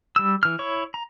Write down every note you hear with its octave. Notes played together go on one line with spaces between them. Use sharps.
G3 E6
E3 F6
E4 C#5 C#6
A#5